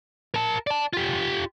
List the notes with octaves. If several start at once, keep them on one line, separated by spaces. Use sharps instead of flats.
A#4 A5
D5 A5
F4 G4